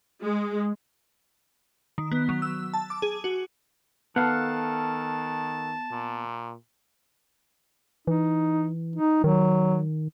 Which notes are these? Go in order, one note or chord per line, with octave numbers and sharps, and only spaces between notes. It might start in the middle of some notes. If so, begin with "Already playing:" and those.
G#3
D#3
B3
F#3
E6
A5
D6
G#4
F#4
D#3 B3 A4 F5 F#5 A5
A#2
E3 D#4
D#4
D#3 F#3